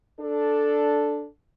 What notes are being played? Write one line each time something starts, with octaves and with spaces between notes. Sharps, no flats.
D4 A4